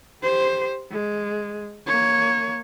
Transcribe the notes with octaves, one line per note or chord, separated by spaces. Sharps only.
G4 C5
G#3
A#3 C#5